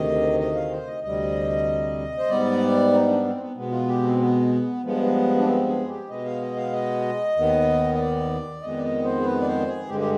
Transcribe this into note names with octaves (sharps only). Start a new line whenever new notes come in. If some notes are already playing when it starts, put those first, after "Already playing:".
Already playing: D2 C3 D#3 D#5
D#5
F5
C5
D#5
D2 C3 G3 D#5
C5
G#2 G3 B3 D5
D#4
D4
C4
B3
B2 G#3 B3
F4
G4
C4
B3
G2 F3 G#3 B3
D4
C4
G#4
G4
B2 G#3 B3 D#5
F5
D#5
F5
D#5
D#2 D#3 B3
D#5
D5
F2 D#3 G#3 B3 D#5
D5
D#5
C5
G#4
B4
D5
C5
G#4
G2 D3 G#3 G4
G4